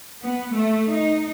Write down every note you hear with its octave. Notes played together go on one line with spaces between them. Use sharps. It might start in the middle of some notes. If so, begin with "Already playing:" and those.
B3
A3
D#4